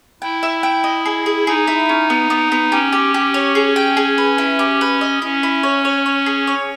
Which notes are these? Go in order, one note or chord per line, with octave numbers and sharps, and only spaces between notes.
E4 G5
E5
G5
D#5
G#4
G#4
D#4 G#4
E4
C#4
B3
B3
B3
C#4 G4
G4
G4
C#5
G#4
G5
G#4
B4
E4
G4
B4
D#5
C#4 E4
E4
C#5
C#5
C#5
G#4
C#5